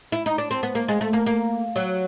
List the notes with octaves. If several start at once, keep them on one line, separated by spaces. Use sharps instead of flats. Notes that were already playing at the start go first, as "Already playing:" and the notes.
E4
D#4
D4
C4
B3
A#3
G#3
A3
A#3
A#3
F#3